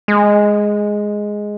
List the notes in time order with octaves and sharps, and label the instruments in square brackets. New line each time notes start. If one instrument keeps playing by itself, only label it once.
[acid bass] G#3